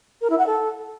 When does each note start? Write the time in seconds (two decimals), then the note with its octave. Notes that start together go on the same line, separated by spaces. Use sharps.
0.21 A#4
0.30 E4
0.38 F#5
0.47 A4